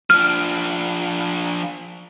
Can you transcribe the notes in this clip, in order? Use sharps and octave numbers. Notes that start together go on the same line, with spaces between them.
F3 D4 F6